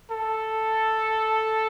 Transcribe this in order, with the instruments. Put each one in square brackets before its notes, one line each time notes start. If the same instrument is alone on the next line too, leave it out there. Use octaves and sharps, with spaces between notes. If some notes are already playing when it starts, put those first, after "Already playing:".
[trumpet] A4